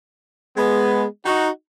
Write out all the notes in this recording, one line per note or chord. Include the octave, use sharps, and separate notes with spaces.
G#3 B3
D#4 F#4